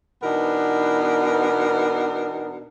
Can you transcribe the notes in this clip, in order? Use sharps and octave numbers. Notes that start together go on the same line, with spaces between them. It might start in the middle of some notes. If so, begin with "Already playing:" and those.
B2 E3 B3 D4 D#4 A#4